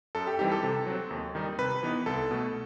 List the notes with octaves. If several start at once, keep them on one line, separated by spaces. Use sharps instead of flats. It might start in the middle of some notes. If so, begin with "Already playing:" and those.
F#2 A4
G4
E3 G3 C4 D#4 G4
A4
C3
F#3 C4
D#2
D#3 G3 D#4
C3 B4
E3 B3 D#4
C2 A4
B2 A3